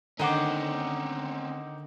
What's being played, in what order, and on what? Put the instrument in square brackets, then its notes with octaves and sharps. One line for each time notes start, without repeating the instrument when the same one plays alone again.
[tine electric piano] D3 [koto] D#3 C5 [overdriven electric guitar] C4 C#4 [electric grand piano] D#4 F#5 D6